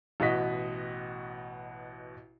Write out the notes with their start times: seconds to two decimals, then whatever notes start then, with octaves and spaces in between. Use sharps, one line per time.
0.20 A1 B2 F#4 D#5 B6